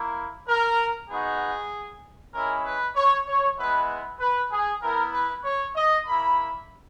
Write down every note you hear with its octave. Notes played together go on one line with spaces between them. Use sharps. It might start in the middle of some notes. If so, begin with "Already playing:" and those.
Already playing: A#3 E4
A#4
B3 D#4 F#4 G#4
G#3 C#4 E4 A#4
B4
C#5
C#5
G#3 B3 E4 B4
B4
G#4
B3 E4 A#4
B4
C#5
D#5
A#3 E4 B5